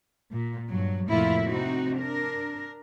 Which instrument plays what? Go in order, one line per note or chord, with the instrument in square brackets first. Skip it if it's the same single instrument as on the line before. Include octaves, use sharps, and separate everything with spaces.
[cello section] A#2
G2 F#3
F2 A2 C3 A#3 E4 F4
C3 C4 D#4 F#4
D4 A#4